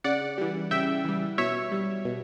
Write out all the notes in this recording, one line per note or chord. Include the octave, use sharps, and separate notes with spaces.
C#3 D5 F#5
E3 G3
C#3 E5 G5
E3 G3
B2 C#5 E5
G3
B2